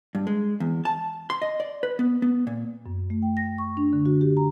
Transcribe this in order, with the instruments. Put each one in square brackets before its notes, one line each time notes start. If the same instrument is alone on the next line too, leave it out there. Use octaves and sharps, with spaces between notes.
[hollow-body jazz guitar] G2
G#3
E2
A5
C6
D#5
D5
B4
B3
B3
A#2
[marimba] F#2
A3
G5
A#6
C#6
D4
D3
F#4
G4
A#5